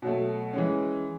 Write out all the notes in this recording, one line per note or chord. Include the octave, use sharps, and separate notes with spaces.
B2 F#3 A3
E3 G#3 C#4